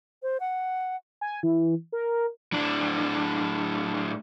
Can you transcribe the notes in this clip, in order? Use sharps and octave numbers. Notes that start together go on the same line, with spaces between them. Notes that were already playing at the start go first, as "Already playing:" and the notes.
C5
F#5
G#5
E3
A#4
A2 D4